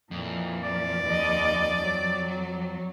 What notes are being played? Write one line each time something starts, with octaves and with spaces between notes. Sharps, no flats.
F2 A#2 E3
D5
D#2 D#5
F#3